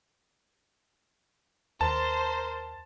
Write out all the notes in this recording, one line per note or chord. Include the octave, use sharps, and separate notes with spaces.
D#2 A#4 C5 A5